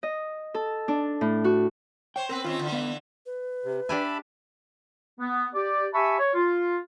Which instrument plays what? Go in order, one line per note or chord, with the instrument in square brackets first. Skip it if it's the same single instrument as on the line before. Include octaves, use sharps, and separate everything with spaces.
[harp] D#5
A4
D4
A2
F#4
[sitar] C5 C#5 [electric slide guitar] G5
[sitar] B3 C4 B4 [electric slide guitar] A#4
[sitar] D#3 C4 C#4 [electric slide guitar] F4
[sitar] D3 E3
[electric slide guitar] B3 F5
[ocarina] B4
[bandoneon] C3
[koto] D4 G4 G#5 [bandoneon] E5 A5 B5
[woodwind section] B3
G4 D5
G4 E5 G#5 A5 B5 C#6
C#5
F4